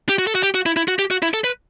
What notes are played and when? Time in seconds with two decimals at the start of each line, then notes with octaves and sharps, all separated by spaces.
0.09 G4
0.19 F#4
0.27 A4
0.35 F#4
0.43 G4
0.54 F#4
0.66 E4
0.77 E4
0.88 F#4
0.99 G4
1.11 F#4
1.22 E4
1.34 A4
1.44 B4